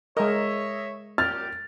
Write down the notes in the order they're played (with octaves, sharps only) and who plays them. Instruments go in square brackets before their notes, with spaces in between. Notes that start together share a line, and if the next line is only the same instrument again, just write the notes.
[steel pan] G#3 A#4 [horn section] C#5 E5 [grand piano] D#5
[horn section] F#2 A#2 G4 [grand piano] F6 [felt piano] A6